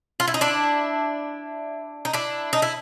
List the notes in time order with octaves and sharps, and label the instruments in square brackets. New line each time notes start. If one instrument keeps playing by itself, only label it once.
[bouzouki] F4
E4
D#4
D4 E4
D#4
D4 E4
D#4
E4